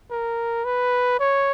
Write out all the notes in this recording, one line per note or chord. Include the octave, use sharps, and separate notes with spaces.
A#4
B4
C#5